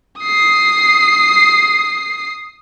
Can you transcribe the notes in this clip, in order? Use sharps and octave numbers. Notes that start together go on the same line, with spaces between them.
D#6 C7